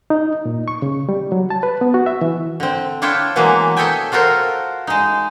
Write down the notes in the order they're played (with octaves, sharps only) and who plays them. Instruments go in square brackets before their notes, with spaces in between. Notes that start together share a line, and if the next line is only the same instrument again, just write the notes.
[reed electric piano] D#4
A#2
C#6
C#3
G3
F#3
A5
B4
B3
F#4
E5
E3
[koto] D3 C4
D4 E4 F4 C#5 E5 G5
B2 E3 F#3 G#3 A#3
A4 C#5 D#5 E5 G5 G#5
F4 F#4 A4 A#4 C5
G#3 D#4